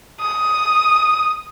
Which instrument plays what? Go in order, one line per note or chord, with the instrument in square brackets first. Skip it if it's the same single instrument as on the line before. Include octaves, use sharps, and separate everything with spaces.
[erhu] D#6